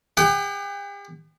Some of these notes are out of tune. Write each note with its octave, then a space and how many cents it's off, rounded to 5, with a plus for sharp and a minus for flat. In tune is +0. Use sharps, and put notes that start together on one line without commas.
G4 +45 G5 -45